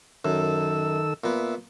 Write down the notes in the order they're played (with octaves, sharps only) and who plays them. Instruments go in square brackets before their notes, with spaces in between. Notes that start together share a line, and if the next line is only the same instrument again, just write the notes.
[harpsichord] F#2 [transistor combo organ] D#3 A4 E6
[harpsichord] A#2 B3 [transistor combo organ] E5